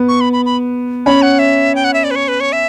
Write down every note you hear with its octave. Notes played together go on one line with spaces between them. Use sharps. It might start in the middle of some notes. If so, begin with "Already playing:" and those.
Already playing: B3
C#6
B5
B5
B5
C#4 B5
F#5
E5
G5
F#5
E5
D5
B4
C#5
B4
C#5
E5